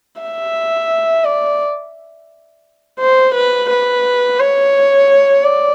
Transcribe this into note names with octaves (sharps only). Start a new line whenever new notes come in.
E5
D5
C5
B4
B4
C#5
D5